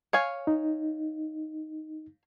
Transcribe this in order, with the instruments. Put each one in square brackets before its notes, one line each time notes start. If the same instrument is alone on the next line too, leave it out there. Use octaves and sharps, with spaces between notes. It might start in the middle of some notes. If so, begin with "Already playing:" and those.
[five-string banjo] C#5 F5 G#5
[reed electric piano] D#4